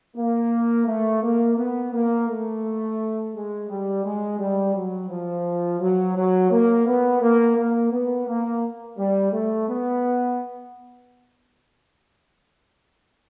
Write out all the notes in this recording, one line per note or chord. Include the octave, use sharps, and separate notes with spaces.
A#3
A3
A#3
B3
A#3
A3
G#3
G3
G#3
G3
F#3
F3
F#3
F#3
A#3
B3
A#3
A#3
B3
A#3
G3
A3
B3